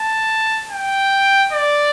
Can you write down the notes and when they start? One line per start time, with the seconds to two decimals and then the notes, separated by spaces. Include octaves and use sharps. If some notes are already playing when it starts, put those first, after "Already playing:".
Already playing: A5
0.71 G5
1.53 D5